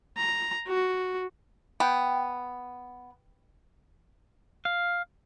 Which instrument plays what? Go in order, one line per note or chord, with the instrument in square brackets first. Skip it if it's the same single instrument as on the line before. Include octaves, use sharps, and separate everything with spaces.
[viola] A#5
F#4
[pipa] B3 [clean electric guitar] G5
[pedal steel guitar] F5